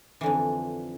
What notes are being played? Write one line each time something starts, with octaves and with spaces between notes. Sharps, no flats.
F2 D3 E3